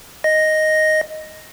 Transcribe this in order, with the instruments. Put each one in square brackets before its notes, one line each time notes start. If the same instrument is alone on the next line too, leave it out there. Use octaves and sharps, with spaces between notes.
[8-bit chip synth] D#5 A#6